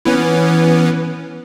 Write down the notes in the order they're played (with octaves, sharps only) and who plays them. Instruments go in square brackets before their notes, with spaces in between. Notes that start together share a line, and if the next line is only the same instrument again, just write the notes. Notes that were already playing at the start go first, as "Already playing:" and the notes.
[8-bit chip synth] E3 B3 C#4